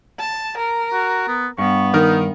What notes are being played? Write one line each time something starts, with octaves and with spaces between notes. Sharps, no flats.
A5
A#4
F#4
B3
G2 B3 C#6
D#3 D#4 A#4